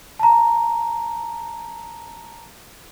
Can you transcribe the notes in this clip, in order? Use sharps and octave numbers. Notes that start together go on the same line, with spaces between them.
A5 A#5